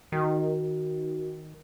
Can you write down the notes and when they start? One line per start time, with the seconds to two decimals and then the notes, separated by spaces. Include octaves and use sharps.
0.12 D#3 F#4